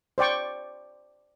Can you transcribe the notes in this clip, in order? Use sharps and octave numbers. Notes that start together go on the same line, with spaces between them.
C5 D5 G5 C#6